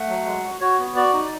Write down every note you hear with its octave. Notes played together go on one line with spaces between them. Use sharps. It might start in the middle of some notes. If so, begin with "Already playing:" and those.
Already playing: A3 F#5
F#3
G#3
F#4
F#4 C#5
B3
F#4 D5
D#4